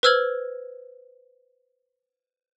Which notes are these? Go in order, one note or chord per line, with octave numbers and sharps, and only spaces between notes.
B4 C5 E6 F6 G#6 F#7